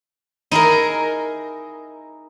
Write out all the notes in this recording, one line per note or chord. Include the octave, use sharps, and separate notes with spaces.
D#4 E4 G#4 A#4